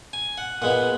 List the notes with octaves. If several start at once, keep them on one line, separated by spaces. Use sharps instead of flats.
G#5
F#5
A#2 G#3 B3 F#5